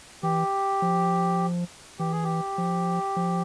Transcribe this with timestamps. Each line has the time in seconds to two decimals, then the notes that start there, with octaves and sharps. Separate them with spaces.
0.23 E3 G4
0.82 F3
1.99 E3 G4
2.12 G#4
2.24 G4
2.58 F3
3.16 F3